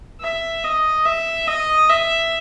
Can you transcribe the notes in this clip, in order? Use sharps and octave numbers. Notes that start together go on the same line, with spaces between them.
E5
D#5
E5
D#5
E5